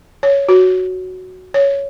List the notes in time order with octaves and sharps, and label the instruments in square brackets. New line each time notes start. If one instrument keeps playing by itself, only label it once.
[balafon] C#5
F#4
C#5